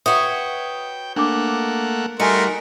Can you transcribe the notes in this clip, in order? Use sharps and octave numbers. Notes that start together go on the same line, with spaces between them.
F#4 B4 C#5 E5 G5 D#6
A3 A#3 D4 F#5 D6
G3 A3 D#4 F#4 A#4 G#5 C6 C#7